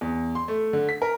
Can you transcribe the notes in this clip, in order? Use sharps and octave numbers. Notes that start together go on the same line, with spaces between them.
E2
C6
A3
D3
B6
A#4